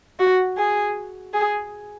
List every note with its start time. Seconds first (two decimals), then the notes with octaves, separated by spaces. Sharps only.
0.19 F#4
0.57 G#4
1.34 G#4